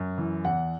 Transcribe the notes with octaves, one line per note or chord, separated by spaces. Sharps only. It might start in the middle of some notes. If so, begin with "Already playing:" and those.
Already playing: F#2
E3
E2 F#5